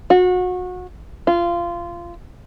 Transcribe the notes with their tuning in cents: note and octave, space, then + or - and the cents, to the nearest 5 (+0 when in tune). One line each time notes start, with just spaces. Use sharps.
F#4 -30
F4 -20